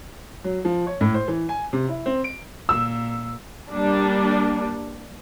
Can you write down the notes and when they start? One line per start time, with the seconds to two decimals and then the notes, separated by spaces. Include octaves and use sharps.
0.44 F#3
0.65 F3
0.87 C#5
1.01 A2
1.14 C5
1.28 E3
1.49 G#5
1.73 C3
1.89 E4
2.06 C4
2.24 D7
2.69 A#2 E6
3.71 G3 A#3 D4